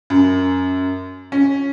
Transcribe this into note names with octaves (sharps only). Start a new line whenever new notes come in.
F#2
C#4